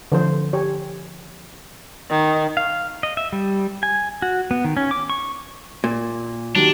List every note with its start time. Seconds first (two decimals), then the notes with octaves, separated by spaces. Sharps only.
0.12 D3 F3 C5
0.53 G4 C#5
2.11 D#3
2.57 F5
3.03 D#5
3.17 E5
3.33 G3
3.83 G#5
4.22 F#4
4.51 B3
4.64 D#3
4.77 C#4
4.91 D6
5.10 C#6
5.84 A#2
6.55 D#3 F#3 G3 D4